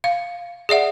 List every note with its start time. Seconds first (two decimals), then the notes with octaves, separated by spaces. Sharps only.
0.04 F5
0.69 G#4 D5 E5 F#5